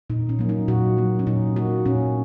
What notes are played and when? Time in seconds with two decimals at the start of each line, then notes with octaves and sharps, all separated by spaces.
0.10 A#2 D#4
0.29 C#4
0.39 F#3 A#3
0.49 D#4
0.68 A#2 F#4
0.97 F#3 A#3
1.19 C#4
1.27 A#2 D#4
1.56 A#3 F#4
1.86 A#2 C#4